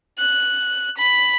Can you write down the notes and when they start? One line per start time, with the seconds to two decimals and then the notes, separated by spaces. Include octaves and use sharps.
0.19 F#6
0.97 B5